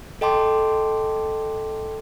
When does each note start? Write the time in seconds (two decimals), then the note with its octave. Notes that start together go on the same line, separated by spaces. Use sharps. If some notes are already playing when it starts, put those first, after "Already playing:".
0.21 A4 D#5 G5 A5 C6 D6